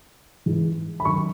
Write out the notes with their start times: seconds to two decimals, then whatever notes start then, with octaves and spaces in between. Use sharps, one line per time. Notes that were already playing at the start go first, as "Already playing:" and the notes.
0.46 G#2 E3 G#3
1.00 B5
1.05 D#3 F#3 C#6